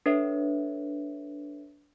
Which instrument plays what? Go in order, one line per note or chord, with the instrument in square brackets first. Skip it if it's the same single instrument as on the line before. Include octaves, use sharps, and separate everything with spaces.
[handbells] D4 A4 B4 C#5 E5